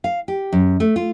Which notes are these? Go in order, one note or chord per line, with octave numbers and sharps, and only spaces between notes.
F5
G4
F#2
A3
F4